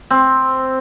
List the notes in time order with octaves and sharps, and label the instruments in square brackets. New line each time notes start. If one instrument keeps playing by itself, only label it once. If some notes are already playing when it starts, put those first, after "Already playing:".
[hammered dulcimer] C4